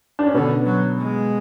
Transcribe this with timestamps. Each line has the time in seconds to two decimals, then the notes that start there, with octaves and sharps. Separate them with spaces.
0.19 D4
0.27 C#4
0.34 B2 D3 B3
0.65 F#3
0.98 G#3